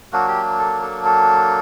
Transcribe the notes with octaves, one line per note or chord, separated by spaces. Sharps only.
F#3 A#3 D4 F#4
G4
A4
A4
A4